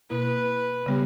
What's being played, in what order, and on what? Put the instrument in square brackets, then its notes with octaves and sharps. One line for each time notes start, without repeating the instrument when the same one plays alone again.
[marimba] B2 A#3 E4 [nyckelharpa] B4
[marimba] C#3 G3 B3 G4